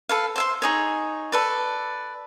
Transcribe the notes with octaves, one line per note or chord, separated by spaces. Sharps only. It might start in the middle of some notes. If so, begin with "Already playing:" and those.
A4 B4 F5
C5 E5 C6
D#4 G#4 C#5
A4 B4 D5